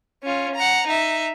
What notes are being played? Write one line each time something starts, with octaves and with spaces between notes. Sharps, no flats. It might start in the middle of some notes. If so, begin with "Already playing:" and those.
C#4 F4
F#5 A#5
D#4 E5